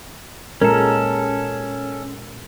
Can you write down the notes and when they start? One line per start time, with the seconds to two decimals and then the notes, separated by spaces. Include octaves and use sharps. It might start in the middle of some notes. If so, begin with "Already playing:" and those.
0.62 A#2 G#3 C#4 A4 A#4